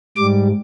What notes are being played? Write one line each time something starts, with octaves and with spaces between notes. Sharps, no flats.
G#2 G3 D6